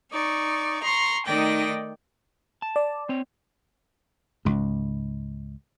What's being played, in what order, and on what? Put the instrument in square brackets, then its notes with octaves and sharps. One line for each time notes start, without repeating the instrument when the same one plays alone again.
[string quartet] D#4 D5 C#6
A#5 C6 C#6
D#3 A3 D#4 D5 G5 A#6
[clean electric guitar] A5
[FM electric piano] D5
[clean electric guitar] C4 C#5
[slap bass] C#2 G#2